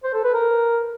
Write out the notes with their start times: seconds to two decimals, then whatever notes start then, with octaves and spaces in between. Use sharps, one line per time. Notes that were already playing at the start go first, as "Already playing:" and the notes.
0.04 C5
0.14 A4
0.24 B4
0.34 A#4